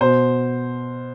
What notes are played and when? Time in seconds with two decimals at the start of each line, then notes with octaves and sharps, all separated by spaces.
0.01 B2 C5